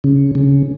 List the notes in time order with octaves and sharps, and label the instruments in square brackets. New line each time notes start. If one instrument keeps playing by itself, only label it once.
[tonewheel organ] C#3
C#3